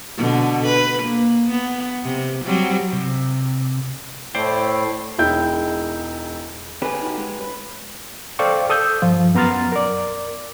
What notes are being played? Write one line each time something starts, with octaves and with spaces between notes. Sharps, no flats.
B2 D3
B4
A#3
B3
C3
F#3 G3 C4
C3
A2 A3 E4 C5 D5 G5
E1 G#3 D#4 E4 G5 G6
D3 C#4 G4 G#4 B4 G#5
D#4 F#4
G#3
B4
A4 C5 D5 F5 G5 C#6
A4 D#6 E6 G6
G2 F3 F4
F#2 B3 A#5 C6 F6 A6
A#4 D5